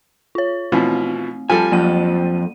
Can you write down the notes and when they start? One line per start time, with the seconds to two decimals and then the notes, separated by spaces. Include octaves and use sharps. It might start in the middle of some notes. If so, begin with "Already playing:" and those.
0.35 F4 C#5
0.72 B2 E3 F3 A3 C4
1.50 F3 G3 A4 G#5
1.72 F2 F#3 A#3 D#7